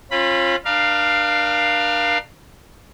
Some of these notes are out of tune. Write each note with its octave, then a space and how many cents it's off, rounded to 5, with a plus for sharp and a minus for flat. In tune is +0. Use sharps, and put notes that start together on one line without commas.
C#4 -40 F4 +0 B5 +0
D4 +35 A#4 +30 F5 +0